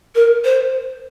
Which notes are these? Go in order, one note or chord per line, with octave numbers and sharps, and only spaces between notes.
A#4
C5